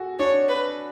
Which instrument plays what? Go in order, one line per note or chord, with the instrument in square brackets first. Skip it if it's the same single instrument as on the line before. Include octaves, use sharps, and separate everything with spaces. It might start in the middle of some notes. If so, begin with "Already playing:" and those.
Already playing: [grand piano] F#4 G#4 A4
[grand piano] D4 [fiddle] C#5
[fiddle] B4